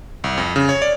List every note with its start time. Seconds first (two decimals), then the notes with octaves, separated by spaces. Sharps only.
0.24 C2
0.38 F2
0.56 C#3
0.69 C#5
0.82 D5